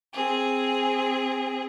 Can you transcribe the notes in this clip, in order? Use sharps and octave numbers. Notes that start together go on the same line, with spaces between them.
C4 G#4